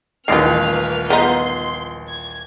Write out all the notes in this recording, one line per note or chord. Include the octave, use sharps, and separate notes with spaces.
D#1 A1 D#3 F4 A#4 B4 F6 C7
F3 B3 D#4 C6
G#6